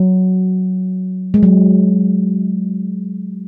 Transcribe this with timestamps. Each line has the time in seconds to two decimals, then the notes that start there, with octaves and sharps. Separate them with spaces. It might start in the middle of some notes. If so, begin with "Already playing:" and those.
Already playing: F#3
1.34 G#3
1.43 F#3